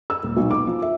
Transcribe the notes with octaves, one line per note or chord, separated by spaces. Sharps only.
E6
D#1
B1
D6
F3
E5